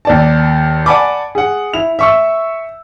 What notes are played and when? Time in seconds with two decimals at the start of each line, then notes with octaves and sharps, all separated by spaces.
0.05 D#2 D5 A5
0.86 D5 F#5 G#5 A5 B5 D6
1.35 G#4 F#5
1.74 E4 F7
1.99 E5 C#6 E6